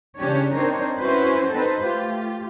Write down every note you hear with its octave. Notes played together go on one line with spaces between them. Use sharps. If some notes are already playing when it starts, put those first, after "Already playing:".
C#3 E3 C#4 D4 G4 C#5
C4 D4 D#4 A#4 C5 C#5
C#4 E4 F#4 B4 C5
C4 D#4 A4 B4 C5
A3 F4 G4